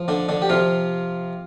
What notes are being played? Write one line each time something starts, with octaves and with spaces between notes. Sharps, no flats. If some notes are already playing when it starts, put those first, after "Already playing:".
Already playing: F3
D3 D4
D3 D4
G4
C3 F3 F4